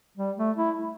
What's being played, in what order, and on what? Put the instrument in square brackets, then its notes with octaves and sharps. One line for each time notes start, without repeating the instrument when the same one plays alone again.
[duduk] G3
A3
E4